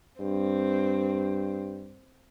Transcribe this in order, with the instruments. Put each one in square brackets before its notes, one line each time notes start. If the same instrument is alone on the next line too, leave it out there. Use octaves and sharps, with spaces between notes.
[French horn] G2 [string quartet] C4